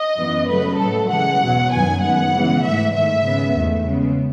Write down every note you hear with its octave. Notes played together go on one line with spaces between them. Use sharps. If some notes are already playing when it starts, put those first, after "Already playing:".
Already playing: D#5
F#2 E3 B3
C#3 F#3 A3 B4
A2 F#3 A3 A4
C#3 E3 G#3 F#5
E2 B2 F#3
F#2 D#3 F#3 B3 G#5
F#2 D#3 G#3 B3 F#5
C#3 E3 G#3 B3
G#2 E3 A3 E5
G#2 D#3 A3 E5
C#3 G#3 B3
E2 D#3 A3
C#3 G#3 B3